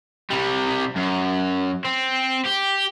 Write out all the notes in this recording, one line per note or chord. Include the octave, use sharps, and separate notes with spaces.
C3 G3
F#2
C4
G4